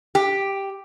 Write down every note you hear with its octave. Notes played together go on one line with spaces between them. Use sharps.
G4